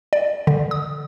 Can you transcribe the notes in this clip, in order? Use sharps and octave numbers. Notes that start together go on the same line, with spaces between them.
D5
D3
D#6